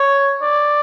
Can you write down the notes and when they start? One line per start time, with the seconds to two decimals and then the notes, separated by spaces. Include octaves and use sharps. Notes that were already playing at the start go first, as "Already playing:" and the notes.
Already playing: C#5
0.42 D5